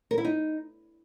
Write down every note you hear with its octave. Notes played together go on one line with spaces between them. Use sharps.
A#4
E4
D#4